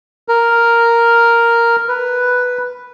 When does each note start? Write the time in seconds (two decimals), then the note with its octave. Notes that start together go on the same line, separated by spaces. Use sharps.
0.28 A#4
1.88 B4